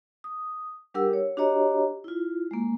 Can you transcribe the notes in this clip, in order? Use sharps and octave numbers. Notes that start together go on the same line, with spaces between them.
D#6
G3 D4 G4 A#4 F#5 E6
C#5
D4 F#4 G4 C#5 D#5 A#5
E4 F4
G#3 A#3